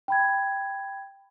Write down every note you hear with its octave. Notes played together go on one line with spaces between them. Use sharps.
G5 B5 G#6